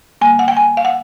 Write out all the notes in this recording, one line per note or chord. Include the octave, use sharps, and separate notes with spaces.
D3 G3 A#3 G#5
F#5
G5
G#5
F5
F#5